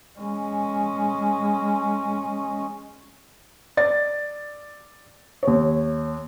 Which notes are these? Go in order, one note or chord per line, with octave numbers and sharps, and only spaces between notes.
G#3 C#4
D5 A6
D#2 C#5